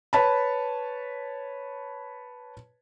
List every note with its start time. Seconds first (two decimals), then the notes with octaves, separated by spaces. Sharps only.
0.13 B4 C#5 A5 B5